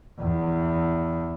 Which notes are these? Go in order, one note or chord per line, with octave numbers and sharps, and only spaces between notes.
E2